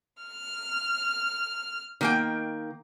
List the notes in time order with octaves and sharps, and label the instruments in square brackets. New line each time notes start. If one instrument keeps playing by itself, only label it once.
[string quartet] F6
[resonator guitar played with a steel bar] D#3 A#3 G5